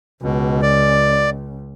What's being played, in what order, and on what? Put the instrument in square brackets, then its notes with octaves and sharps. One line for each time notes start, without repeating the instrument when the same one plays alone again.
[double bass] C#2 [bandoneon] B2
[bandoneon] D5